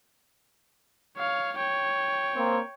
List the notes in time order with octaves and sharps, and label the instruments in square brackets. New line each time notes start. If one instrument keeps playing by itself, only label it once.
[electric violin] C#5 F5
C#5 G5
[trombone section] A#3 C4